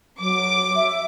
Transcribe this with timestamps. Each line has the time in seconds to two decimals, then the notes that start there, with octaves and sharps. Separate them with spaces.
0.20 F#3 D6
0.76 E5